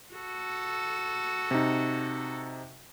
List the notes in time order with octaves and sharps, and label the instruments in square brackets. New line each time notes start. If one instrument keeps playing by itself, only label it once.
[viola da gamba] F#4 A4
[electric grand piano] C3 D#4